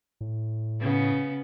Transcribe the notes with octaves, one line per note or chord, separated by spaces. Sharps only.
A2
C#3 B3